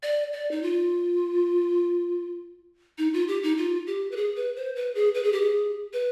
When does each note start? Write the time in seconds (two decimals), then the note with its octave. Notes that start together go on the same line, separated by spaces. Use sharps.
0.03 D5
0.33 D5
0.51 D#4
0.62 F4
2.98 D#4
3.13 F4
3.28 G4
3.43 D#4
3.57 F4
3.87 G4
4.12 B4
4.16 G#4
4.36 B4
4.56 C5
4.76 B4
4.95 G#4
5.15 B4
5.23 G#4
5.32 G4
5.41 G#4
5.93 B4